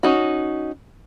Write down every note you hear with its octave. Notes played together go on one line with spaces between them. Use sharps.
C#4 D#4 F#4